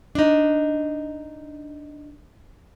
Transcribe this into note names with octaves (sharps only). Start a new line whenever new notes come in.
D4 D#4